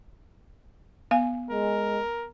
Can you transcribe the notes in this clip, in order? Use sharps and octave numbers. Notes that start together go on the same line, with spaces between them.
B3 F5 G#5
G#3 A#4